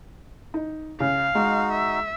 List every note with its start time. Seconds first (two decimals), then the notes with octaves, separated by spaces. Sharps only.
0.54 D#4
1.00 C#3 F5
1.35 G#3 D#4 F#4
1.72 E5